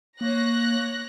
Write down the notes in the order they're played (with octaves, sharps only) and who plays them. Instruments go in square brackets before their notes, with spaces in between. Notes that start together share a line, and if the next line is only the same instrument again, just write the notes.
[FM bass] A#3 [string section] C#5 F#6 A#6